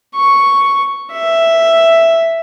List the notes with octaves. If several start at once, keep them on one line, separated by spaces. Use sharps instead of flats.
C#6
E5